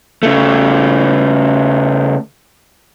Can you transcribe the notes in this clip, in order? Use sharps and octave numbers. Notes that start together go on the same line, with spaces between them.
C#3 A3